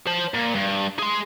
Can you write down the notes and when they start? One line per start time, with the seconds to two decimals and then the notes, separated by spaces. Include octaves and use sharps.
0.07 C5 A5
0.34 A#2
0.55 G2
0.99 G#4 C6